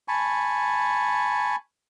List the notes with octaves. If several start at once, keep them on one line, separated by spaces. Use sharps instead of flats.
G#5 A5 B5 C#6